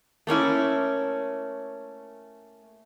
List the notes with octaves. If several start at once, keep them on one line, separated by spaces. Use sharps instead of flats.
A3 A#3 C#4 E4